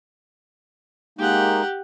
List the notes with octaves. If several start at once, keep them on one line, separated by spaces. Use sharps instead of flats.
G#3 A#3 D#4 G4 F#5